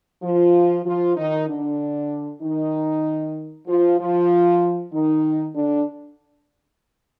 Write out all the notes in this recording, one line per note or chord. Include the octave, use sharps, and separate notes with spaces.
F3 F4
F3 F4
D#3 D#4
D3 D4
D#3 D#4
F3 F4
F3 F4
D#3 D#4
D3 D4